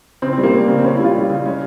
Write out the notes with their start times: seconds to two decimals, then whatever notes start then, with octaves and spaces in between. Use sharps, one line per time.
0.22 C#3 C4
0.33 C4
0.38 G3
0.43 A#3
0.53 G3 C4
0.68 C#3
0.79 C4
0.84 C#3 C#4
0.95 E4
0.99 G3 F4
1.15 G3
1.30 C#3
1.45 G#3 C#4